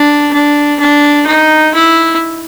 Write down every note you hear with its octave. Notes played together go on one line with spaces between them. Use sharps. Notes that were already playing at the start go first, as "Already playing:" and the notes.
Already playing: D4
D4
D4
D#4
E4